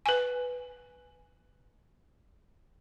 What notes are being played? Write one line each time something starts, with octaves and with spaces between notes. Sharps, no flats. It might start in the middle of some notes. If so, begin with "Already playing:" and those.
B4 G#5